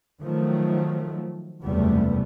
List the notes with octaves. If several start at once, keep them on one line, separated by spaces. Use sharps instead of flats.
D#3 F3 F#3 A3
F#1 E2 C3 G3 A3 B3